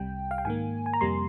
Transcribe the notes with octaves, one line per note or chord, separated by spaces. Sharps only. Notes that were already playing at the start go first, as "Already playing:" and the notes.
Already playing: C2 C3 G3 G5
F5
G5
G#2 D#3 A#3 G#5
G#5
A#5
F2 C3 G3 A#3 C6